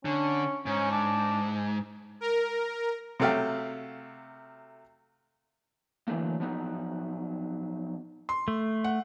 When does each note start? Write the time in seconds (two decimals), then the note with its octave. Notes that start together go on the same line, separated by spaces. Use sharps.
0.05 D3 C#4
0.66 G#2 C#4
0.91 D4
2.21 A#4
3.20 C3 F#3 A3 F5 G5
6.08 D3 E3 F#3 A3 A#3
6.40 F3 F#3 B3 D#4
8.29 C6
8.48 A3
8.84 F#5